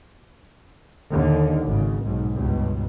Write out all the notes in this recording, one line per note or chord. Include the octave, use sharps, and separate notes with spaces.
D#2 D3
G#1 C#3
B1 G#2
C#2 G2 B2